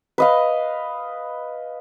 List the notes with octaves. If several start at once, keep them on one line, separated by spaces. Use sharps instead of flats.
B4 D#5 F5